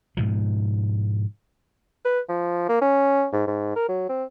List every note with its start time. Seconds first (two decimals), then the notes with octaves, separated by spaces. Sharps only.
0.17 G#2 B2 F3
2.05 B4
2.29 F3
2.69 A#3
2.81 C#4
3.32 G#2
3.47 G#2
3.76 A#4
3.88 F#3
4.09 C4